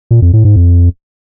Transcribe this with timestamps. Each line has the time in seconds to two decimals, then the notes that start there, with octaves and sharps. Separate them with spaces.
0.11 A#2
0.22 F2
0.33 A2
0.45 G#2
0.56 F2